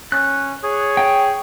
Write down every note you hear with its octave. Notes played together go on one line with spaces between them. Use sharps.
C#4 F#6
G#4 C#5
G5